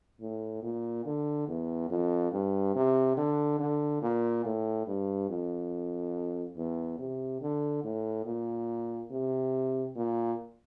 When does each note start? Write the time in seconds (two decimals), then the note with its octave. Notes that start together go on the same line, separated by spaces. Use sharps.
0.21 A2
0.63 A#2
1.06 D3
1.48 E2
1.90 F2
2.33 G2
2.75 C3
3.17 D3
3.59 D3
4.02 A#2
4.45 A2
4.87 G2
5.30 F2
6.57 E2
6.99 C3
7.41 D3
7.84 A2
8.26 A#2
9.11 C3
9.96 A#2